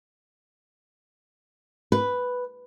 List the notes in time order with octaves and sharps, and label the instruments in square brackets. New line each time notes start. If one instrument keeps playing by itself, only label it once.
[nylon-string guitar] B4